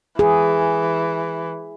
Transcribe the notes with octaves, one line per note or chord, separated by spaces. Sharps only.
E3 G#4